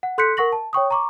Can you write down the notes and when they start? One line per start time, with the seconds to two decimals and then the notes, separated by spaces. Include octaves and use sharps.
0.03 F#5
0.18 A4 C6 F#6 G6 B6 C#7
0.37 A#4 F#5 C#6 A#6 F#7
0.52 A5
0.73 C#5 G5 C#6 D#6
0.91 A#5 C#6 D6